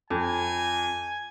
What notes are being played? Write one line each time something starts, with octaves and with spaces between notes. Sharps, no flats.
F2 G#5